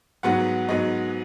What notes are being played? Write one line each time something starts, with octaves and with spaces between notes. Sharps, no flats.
G#2 F#3 B3 F#5
G#2 F#3 B3 D#5